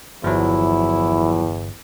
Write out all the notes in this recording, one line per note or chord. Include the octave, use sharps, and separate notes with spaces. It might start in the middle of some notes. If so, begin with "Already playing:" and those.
G1 E2 F3 F#3 E4